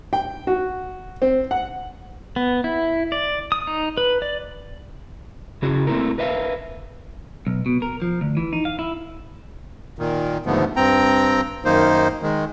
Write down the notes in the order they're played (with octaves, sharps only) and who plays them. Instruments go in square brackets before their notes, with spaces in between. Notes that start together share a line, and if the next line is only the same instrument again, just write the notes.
[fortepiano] G5
F#4
C4
F#5
[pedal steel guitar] B3
E4
D5
D#6
D#4
B4
D5
[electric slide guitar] C#3 C#4 E4 F#4 G#4
A3 A#3 C4 E4 G4 A#4
A#4 B4 E5 F5
[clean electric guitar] B1
B2
A#4
F3
D2
E3
D#4
F5
E4
[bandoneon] A#2 D#3
D#2 G#2 D3 F3 A3 B3
G2 C4 G5 A#5
F#2 D#3 A#3 D#4 C5
D#3 G#3